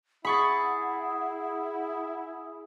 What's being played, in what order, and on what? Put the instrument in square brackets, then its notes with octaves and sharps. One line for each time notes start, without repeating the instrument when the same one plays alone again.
[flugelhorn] E4 [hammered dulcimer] G#4 [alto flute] F#5 [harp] B5 C#6 A6